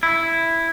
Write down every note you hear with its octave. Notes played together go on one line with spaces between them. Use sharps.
E4